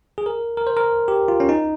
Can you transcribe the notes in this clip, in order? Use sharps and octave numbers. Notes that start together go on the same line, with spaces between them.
G#4
A#4
A#4
C5
A#4
G4
F4
C#4
D#4